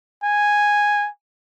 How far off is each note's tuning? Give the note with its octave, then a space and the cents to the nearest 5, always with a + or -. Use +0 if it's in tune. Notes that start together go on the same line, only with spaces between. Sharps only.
G#5 -5